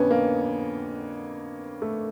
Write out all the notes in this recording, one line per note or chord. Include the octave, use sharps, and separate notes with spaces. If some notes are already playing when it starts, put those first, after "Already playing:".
Already playing: F2 D3 B3 C#4 D4
A#3
A3